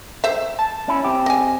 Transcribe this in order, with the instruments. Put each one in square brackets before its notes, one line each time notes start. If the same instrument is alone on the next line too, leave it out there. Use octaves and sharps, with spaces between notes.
[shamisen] C5 E5
[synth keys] A5
[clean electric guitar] C#4 E4
C4 G4
[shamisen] D#5 G#5